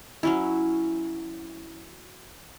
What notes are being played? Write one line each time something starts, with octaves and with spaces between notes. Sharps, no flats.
F#3 C#4 E4